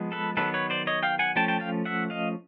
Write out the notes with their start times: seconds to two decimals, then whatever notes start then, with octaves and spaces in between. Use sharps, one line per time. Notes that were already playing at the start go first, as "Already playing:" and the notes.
Already playing: F3 G#3 B3
0.12 A4 B4
0.37 D#3 F#3 B3 A4 B4
0.54 B4 C#5
0.70 C5 D5
0.87 C#5 D#5
1.03 F5 G5
1.19 F#5 G#5
1.36 F3 A3 C#4 G5 A5
1.48 G5 A5
1.60 F5 G5
1.85 E5 F#5
2.10 D#5 F5